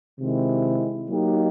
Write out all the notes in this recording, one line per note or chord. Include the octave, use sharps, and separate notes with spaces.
C3 D#3 G#3 C4 E4
F#3 A#3 D#4 G4